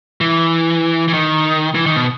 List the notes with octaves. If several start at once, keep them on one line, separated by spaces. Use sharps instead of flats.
E3
E3
D#3
E3
D#3
B2